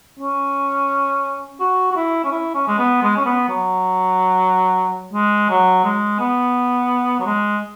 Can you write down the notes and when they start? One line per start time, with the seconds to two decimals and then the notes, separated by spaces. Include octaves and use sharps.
0.20 C#4
1.60 F#4
1.91 F#4
1.96 E4
2.24 C#4
2.31 E4
2.55 C#4
2.68 G#3
2.78 B3
3.03 G#3
3.17 C#4
3.26 B3
3.49 F#3
5.14 G#3
5.50 F#3
5.84 G#3
6.20 B3
7.20 F#3
7.26 G#3